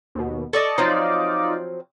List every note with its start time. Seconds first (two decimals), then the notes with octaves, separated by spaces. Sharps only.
0.15 D#2 B2
0.53 A4 D5 D#5 A5 C#6
0.78 F3 F#3 C4 D#4 F4 D5